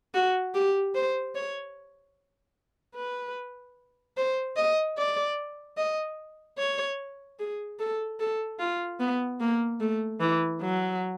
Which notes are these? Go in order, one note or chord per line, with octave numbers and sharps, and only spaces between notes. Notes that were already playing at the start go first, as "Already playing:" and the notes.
F#4
G4
C5
C#5
B4
C5
D#5
D5
D#5
C#5
G#4
A4
A4
F4
B3
A#3
A3
E3
F#3